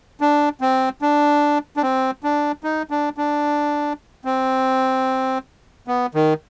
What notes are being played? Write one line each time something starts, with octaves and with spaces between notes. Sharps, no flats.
D4
C4
D4
D4
C4
D4
D#4
D4
D4
C4
B3
D#3